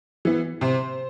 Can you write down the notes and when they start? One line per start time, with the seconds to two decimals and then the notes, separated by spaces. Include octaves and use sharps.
0.25 E3 B3
0.61 C3 C5